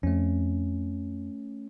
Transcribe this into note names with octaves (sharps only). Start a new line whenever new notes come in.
F2 A3 C#4